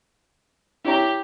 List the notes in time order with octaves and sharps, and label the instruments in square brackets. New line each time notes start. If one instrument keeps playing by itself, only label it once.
[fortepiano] E4 C#5 A#5 [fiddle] G4